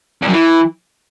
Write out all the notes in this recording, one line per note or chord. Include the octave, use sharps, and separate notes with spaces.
E2
F#2
E3